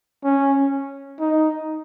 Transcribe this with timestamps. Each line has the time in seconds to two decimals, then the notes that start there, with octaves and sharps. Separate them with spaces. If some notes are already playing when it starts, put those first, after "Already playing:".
0.24 C#4
1.20 D#4